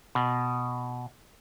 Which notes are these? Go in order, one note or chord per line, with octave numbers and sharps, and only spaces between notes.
B2